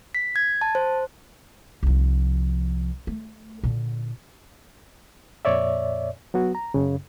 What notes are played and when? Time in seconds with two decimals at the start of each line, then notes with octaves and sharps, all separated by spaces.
0.15 B6
0.36 G#6
0.61 A5
0.75 C5
1.83 C2 F3
3.07 A3
3.64 A#2 D3
5.45 F2 A#2 C#5 D5 E5
6.34 F#3 B3 F#4
6.55 A#5
6.74 F#2 C#3